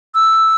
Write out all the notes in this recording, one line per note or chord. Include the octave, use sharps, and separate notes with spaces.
E6